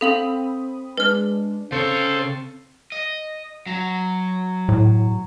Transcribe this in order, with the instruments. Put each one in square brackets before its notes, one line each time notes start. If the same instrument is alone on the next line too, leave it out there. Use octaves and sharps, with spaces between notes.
[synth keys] C4 B5 D#6 [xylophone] A4 F5 F#7
[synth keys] G#3 D4 [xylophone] B4 F6
[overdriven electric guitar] C#3 C#5 [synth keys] C4 [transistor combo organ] A4 C5
[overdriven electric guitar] D#5
F#3
[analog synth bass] A2